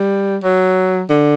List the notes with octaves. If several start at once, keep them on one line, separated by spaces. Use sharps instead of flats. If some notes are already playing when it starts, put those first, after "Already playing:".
Already playing: G3
F#3
D3